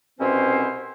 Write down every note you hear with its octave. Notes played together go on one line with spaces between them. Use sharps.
C2 B2 C4 C#4 E4 C5